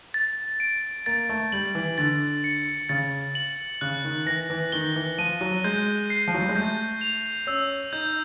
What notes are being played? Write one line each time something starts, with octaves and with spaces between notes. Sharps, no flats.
A6
D7
A#3 A6
A3
G3 F#7
E3
D3 A6
C#7
C#3 A6
F#7
C#3 F#6
D#3
E3 A#6
E3
D#3 G7
E3
F3 D#7
F#3
G#3 G6
C7
F3
F#3
G3
G#3
A3 G6
F7
C#4 E6
D#4 G6